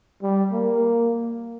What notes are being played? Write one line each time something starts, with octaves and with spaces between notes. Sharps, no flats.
G3
A#3